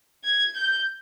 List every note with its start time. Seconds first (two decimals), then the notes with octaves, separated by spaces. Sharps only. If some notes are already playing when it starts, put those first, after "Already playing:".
0.24 G#6
0.55 G6